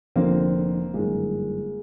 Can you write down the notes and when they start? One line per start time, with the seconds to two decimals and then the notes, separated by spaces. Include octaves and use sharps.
0.16 F1 F2 D3 A#3 C4
0.94 G1 F#2 D#3 G#3 A#3